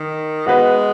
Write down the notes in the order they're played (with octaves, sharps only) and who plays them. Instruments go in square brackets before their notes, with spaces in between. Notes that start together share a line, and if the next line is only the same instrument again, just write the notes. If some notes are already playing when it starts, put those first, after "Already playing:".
Already playing: [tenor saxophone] D#3
[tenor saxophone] G#3 [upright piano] B3 F#4 B4 D#5